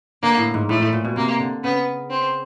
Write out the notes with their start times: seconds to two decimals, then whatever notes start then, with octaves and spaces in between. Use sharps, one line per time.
0.22 D3 A#3
0.38 A2
0.54 G#2
0.69 A2 A3
0.81 A2
0.93 A#2
1.05 B2
1.16 C3 A#3
1.40 D3
1.64 C#3 B3
2.10 C4